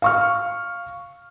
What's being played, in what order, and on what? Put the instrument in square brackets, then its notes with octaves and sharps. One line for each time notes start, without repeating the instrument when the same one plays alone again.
[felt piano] F5 C#6 F6